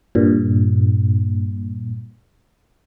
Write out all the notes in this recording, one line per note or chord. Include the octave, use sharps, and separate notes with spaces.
G2 A#2